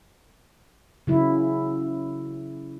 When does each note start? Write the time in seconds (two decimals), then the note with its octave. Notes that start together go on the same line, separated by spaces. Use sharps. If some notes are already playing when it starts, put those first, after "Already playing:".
1.07 C#3 F#3 E4